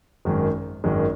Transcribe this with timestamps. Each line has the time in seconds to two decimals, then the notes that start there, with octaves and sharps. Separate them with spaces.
0.25 G#1 F#2 D#3 G#3
0.84 G#1 F#2 D#3 G#3